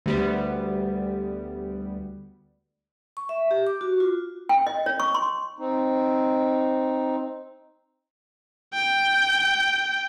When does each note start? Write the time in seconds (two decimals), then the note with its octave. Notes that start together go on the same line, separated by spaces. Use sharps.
0.06 D2 G3 B3
3.17 C#6
3.29 E5
3.51 G4
3.67 D6
3.81 F#4
4.00 F4
4.49 G5
4.67 D#5
4.86 C#5
5.00 C#6
5.15 C6
5.58 C4 D#4
8.74 G5